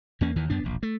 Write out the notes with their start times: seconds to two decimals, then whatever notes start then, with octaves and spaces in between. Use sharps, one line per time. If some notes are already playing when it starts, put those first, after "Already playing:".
0.21 E2 A#3 C#4
0.36 D#2 D#3 E3
0.50 F#2 B3 D4
0.64 E1 A#1
0.83 A3